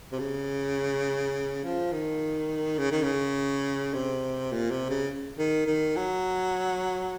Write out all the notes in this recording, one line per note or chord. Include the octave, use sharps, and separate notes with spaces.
C3
C#3
F3
D#3
C#3
D#3
C#3
C3
A#2
C3
C#3
D#3
D#3
F#3